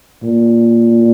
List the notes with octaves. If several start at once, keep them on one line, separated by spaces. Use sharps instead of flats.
A#2